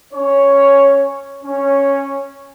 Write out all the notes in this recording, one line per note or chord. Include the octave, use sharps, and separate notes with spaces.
C#4 C#5
C#4 C#5